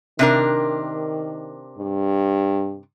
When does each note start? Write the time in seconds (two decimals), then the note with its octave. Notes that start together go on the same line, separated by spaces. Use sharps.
0.19 C3 D#3 D4 A#4
1.78 G2